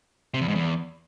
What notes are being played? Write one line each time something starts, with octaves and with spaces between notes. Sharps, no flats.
C3
E2
G#2
E2